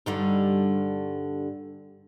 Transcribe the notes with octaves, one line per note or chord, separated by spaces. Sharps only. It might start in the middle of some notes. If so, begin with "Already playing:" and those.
G2 D3 D#4